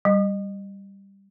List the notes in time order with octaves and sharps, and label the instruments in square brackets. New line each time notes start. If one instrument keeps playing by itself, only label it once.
[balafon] G3